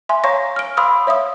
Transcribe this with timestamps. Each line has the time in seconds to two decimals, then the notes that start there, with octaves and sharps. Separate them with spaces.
0.09 E5 G#5 C6
0.24 C#5 F5 A#5 C#6 A#6
0.56 F6 D7
0.77 F5 B5 C6 D#6 E6
1.07 C#5 E5 F5 D#6